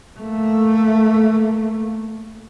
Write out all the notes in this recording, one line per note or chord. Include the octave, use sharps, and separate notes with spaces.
A3 A#3